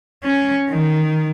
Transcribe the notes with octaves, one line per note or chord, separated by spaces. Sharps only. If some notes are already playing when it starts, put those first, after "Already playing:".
C#4
D#3